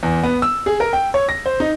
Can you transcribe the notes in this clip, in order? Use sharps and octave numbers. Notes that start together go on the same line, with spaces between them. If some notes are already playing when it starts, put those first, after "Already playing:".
E2
B3
E6
G#4
A#4
G5
C#5
A#6
C5
D#4